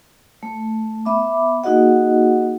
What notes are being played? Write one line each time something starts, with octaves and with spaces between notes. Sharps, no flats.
A3
B3 E5 B5 D6
A#3 D#4 F#4 G#4 D#5 F#5